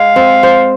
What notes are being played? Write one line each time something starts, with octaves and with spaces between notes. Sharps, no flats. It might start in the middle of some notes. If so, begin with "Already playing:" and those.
Already playing: G#3 F5
C4
C5